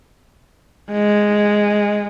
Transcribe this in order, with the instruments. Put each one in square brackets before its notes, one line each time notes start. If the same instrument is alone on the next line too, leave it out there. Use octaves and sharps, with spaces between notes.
[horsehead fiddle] G#3